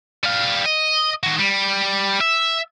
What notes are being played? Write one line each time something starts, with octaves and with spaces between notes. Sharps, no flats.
G3 F5
D#5
D#3 F#4
G3
E5